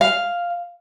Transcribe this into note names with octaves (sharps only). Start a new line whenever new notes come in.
F5